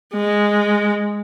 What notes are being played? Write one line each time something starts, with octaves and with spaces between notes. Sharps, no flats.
G#3